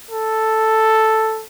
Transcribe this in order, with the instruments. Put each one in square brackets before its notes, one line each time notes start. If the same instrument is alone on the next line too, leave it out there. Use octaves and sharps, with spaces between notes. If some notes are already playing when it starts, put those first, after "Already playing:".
[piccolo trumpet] A4